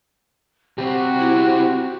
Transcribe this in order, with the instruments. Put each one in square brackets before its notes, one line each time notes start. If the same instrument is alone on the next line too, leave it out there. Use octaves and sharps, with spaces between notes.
[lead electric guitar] C2 C4 [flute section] F#4 [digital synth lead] G4
[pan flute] E4